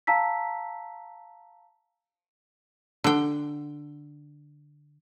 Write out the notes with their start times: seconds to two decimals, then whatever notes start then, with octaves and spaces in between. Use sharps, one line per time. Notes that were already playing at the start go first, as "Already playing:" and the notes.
0.07 F5 A5 A#5 E6 B6
3.04 D3 G5